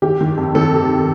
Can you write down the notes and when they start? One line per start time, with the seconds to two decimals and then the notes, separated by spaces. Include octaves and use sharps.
0.02 D#3 G4
0.21 D#3
0.37 F2
0.55 D#3 A4
0.73 C3